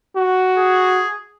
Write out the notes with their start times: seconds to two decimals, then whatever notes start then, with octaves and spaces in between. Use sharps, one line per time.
0.16 F#4
0.58 G#4